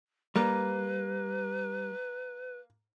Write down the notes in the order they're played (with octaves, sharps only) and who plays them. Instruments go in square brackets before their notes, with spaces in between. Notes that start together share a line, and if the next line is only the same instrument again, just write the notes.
[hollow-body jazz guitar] G3 [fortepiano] A#3 [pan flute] B4